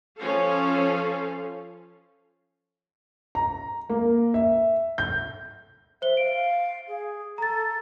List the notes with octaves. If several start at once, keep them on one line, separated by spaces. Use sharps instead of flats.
F3 C#4 A4 F5
A#5
A#3
E5
G6
C5 E5 G7
F5 D7
G#4
A4 A#5 A6